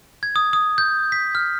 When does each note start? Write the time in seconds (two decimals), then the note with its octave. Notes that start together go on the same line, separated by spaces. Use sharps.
0.23 G#6
0.36 D#6
0.53 D#6
0.78 G6
1.12 B6
1.35 F6